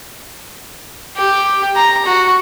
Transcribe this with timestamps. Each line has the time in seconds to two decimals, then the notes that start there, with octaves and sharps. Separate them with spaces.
1.17 G4
1.76 A#5
2.06 F#4